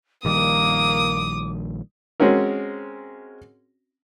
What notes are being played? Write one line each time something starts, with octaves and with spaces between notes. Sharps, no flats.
A#1 D#3 G3 A#3 D6 D#6
G#3 C4 C#4 F#4 A#4